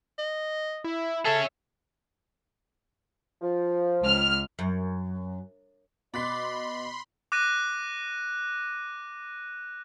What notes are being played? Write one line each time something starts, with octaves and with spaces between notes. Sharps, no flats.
D#5
E4
G#4 A4 C#5 E5
F3
C#2 F6
F#2
B2 D5 D#5 B5 C6 F#6 B6
D6 F#6 A#6 D#7